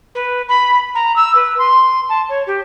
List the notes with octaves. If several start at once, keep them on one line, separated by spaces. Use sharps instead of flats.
B4
B5
A#5
E6
B4
C6
A5
C#5
G4